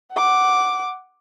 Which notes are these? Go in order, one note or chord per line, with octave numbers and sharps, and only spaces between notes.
F#5 D6